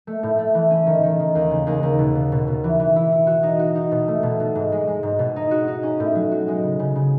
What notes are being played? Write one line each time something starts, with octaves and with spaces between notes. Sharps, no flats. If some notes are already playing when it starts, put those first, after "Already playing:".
A3
A2
A3
E3
C#4
D#3
D#3
D#3
D#2
C#3
D#2
D#2
B2
B2
B2
B2
E3
E3
E4
E4
F#4
D#4
F#4
D#4
B2
A3
B2
B2
G#2
G#3
G#3
G#2
B2
D#4
F#4
D#4
C#4
A2
F#3
F#4
G#3
C#3
C#3
C#3